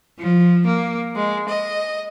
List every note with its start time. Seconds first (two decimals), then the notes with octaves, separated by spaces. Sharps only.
0.20 F3
0.67 A#3
1.15 G#3
1.48 D#5